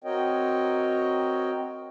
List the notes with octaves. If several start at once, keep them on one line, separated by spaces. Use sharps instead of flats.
C4 F#4 A#4 C#5 D#5 G5